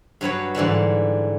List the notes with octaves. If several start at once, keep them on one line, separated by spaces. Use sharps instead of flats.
G2 F#3 B4 C#5
G#2 D3 E3 G3